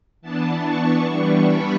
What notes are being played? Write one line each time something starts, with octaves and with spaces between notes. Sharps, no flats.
E3 B3 D4 A5
C#6
E3 G3 B3 D4 C#6
B5